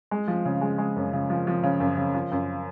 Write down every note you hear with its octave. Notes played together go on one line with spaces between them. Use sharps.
G#3
F3
C#3
G#3
G#3
F#2
C#3
F3
F3
C#3
F#2
C#3
F3
F#2